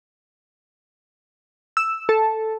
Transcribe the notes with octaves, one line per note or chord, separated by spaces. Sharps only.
E6
A4